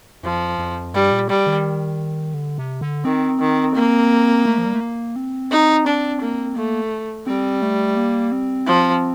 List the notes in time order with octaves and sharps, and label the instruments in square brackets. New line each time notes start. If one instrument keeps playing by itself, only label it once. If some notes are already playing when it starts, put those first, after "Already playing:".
[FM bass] F2 [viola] F3
[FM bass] F2
[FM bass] G2 [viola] G3
[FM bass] A#2
[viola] G3
[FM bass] D#3
D3
C3
D3
[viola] D#3 [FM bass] C4
[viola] D#3
A#3
[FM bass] A3
F3
G3
A3
A#3
C4
[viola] D#4
D4
A#3
[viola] A3 [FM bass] A#3
[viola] G3 [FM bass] C4
[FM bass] A3
A#3
C4
[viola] F3